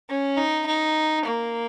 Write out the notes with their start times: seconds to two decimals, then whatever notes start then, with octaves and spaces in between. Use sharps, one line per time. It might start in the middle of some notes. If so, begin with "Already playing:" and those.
0.09 C#4
0.38 D#4
0.67 D#4
1.25 A#3